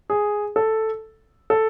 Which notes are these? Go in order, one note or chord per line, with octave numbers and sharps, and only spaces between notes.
G#4
A4
A4